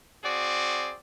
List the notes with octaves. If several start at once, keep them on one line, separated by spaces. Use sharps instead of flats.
C4 F#4 G#4 D5